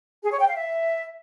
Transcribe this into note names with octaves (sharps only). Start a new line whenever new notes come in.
G#4
C#5
G5
F5
E5